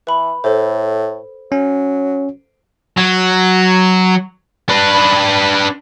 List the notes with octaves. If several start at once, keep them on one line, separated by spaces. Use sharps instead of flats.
E3 B4 B5
A2 A4 C5
F#3 C#4
F#3
D4 B4